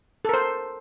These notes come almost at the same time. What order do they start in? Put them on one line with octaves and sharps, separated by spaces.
A4 A#4 C5